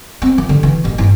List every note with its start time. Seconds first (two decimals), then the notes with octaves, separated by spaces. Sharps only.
0.22 C4
0.38 F3
0.49 D3
0.63 E3
0.84 A1 F#2
0.98 G2 E4